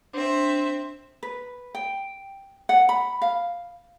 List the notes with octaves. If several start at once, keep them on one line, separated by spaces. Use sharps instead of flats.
C4 D4 E5
B4
G5
F#5
B5
F5